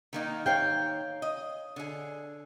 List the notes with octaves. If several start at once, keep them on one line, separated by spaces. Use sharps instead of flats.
D#3 A#3 D#4
C#5 F5 G5
D#5
D3 G#4